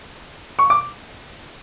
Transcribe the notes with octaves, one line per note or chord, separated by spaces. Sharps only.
C#6
D6